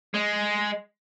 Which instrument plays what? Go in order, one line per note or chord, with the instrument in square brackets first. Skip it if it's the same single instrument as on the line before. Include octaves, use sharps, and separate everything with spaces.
[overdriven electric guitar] G#3